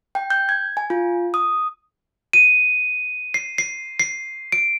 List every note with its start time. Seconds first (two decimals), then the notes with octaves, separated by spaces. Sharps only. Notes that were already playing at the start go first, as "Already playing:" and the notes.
0.15 G5
0.30 G6
0.49 G#6
0.77 G#5
0.90 F4
1.34 D#6
2.33 D#7
3.34 C7
3.58 C7
4.00 C7
4.52 D7